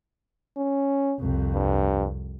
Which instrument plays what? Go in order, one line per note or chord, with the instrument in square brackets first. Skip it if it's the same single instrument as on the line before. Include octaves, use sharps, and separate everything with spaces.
[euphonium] C#4
[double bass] C2 F2
[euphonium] G2